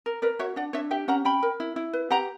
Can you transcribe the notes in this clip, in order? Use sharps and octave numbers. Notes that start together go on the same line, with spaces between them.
A#4
A#4 B4 D5
F#4 C#5 E5
D4 D5 F#5
D4 C#5 E5
G4 E5 G5
C#4 F#5 A#5
C#4 G5 B5
A#4
E4
E4
B4
G4 F#5 A#5